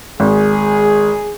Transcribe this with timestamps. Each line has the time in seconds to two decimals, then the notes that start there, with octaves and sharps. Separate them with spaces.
0.20 G#1 G#4